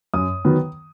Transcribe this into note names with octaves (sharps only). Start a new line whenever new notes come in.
F#2 D#6
D#3 F#3 B3